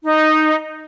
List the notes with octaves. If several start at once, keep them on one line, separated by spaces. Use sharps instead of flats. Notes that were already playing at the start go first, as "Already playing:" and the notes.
D#4